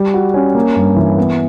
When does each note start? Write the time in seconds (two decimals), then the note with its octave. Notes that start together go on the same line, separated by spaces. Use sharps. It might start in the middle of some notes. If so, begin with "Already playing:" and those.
Already playing: G3
0.14 F#4
0.34 C#4
0.55 A#3
0.76 G2
0.96 E3
1.17 B3